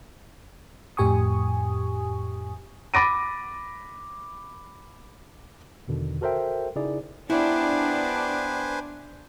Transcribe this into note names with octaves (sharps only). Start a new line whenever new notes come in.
F2 A2 G4 G#5 C#6 D#6
B5 D6 A6 A#6 D7 D#7
E2 B2 D3 D#3
F#4 A4 A#4 C5 E5 G5
C#3 D#4 E4 G#4 D5
B3 D4 E4 G4 B4 C5 G#5